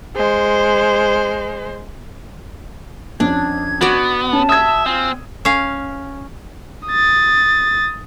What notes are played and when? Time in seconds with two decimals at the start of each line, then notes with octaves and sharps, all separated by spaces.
0.16 G#3 C5
3.20 F2 C#4 D4 G#6
3.81 B3 F#4 D5
4.33 C#4 A5
4.49 E5 D#6 E6 G#6
4.86 C4 F4 G#5 F6
5.45 C#4 F5
6.88 D#6 A6